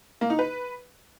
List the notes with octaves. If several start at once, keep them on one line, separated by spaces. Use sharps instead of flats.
A#3
D#4
B4